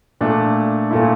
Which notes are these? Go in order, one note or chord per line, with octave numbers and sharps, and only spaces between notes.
A#2 A3 D4
A#2 A3 E4